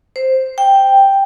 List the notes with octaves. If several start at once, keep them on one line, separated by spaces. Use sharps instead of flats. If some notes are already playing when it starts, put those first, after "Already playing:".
C5
G5